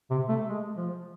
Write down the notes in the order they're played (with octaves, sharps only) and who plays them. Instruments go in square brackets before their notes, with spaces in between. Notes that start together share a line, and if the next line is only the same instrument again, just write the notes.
[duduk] C3
A3
G#3
F3